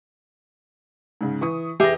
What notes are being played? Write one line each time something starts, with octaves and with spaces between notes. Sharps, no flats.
G#2 C#3
E3 C#6 D#6
E2 G4 G#4 B4 E5 A#6